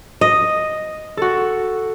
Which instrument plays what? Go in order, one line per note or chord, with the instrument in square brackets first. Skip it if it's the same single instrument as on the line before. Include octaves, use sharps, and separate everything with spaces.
[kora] D#5
[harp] F#4 A4